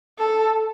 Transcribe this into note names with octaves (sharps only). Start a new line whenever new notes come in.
A4